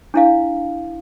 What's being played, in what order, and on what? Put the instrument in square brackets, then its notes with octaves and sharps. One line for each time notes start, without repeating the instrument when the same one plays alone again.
[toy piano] D4 E4 F5